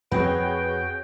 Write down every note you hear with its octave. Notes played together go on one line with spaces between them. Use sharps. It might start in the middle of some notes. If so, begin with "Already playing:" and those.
F2 C4 F#4 G#4 B4 C#5 G5